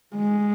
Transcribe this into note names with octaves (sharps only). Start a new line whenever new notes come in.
G#3